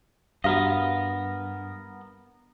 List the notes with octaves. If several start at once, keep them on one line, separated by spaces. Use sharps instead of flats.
G2 B3 F#4 A#4 D#5 F5